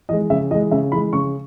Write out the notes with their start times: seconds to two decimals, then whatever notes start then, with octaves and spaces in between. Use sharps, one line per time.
0.09 E3 G#3 D#5
0.30 C#3 E5
0.51 E3 D#5
0.54 G#3
0.71 C#3 E5
0.92 E3 G#3 B5
1.13 C#3 C#6